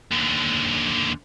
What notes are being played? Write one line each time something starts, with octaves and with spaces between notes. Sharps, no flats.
D#2 D3